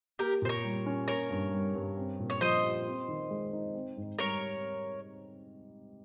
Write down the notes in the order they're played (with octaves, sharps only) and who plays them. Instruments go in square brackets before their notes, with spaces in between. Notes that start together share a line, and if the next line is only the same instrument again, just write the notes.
[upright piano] A#3 [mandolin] G4 A#4
[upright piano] A#2 [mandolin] C5
[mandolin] A#4 C#5
[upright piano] G3
C#4
[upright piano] A#3 [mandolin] A#4 C#5
[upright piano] G2
G3
G2
C4
A#2
[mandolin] C#5
[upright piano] F3 [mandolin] C5 D#5
[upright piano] G4
C4
D#3
G#3
D#4
C4
G#2
[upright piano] G3 [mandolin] A#4 C#5